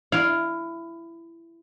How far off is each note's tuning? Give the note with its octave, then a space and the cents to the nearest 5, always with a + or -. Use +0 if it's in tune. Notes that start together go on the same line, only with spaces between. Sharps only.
E4 +20 F5 +0